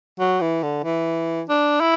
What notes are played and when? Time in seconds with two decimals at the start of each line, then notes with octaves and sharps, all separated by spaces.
0.19 F#3
0.41 E3
0.63 D3
0.84 E3
1.49 D4
1.81 E4